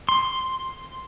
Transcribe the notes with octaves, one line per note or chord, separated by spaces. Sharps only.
C6